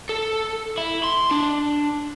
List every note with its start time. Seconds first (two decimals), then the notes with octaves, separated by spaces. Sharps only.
0.09 A4
0.78 E4
1.04 C6
1.31 D4